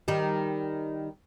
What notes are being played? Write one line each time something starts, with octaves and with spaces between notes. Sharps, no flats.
D#3 G3